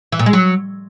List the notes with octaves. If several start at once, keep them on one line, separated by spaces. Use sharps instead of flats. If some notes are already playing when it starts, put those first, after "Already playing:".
E3
A#2
G#3
F#3